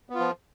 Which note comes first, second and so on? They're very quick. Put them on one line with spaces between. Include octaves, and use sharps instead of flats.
B3 F4 F3